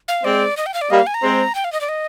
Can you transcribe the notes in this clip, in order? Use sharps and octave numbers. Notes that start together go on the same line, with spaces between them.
F5
G#3 C4 D5
D#5
G5
F5
D5
G3 A#3 D#5
F5
G#5
A#5
G#3 C4
G5
F5
D#5
D5
D#5